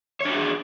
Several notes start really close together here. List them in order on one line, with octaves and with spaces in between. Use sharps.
C#5 D4 F#4 G#4